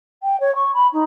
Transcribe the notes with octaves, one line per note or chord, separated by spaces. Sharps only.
G5
C#5
C#6
B5
D#4